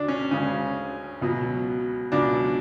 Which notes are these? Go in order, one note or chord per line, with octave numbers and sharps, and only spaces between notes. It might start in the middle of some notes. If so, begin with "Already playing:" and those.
Already playing: D2 F#3 D4
C#4
D2 C#3 G#3 C#4
C#2 B2 F#3
C#2 B2 F#3 D4